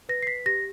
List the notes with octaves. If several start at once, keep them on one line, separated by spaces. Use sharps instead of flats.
B4 A#6
C7
B6
G4 A#6